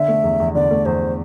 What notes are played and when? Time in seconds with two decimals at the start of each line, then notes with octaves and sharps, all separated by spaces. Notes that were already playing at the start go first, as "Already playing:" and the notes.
Already playing: D3 E5
0.08 A3
0.24 E2
0.40 E2
0.55 D3 D5
0.71 A3
0.86 E2 C5